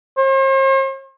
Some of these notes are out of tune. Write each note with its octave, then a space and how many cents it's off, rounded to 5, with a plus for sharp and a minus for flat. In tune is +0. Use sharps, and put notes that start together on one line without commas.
C5 +45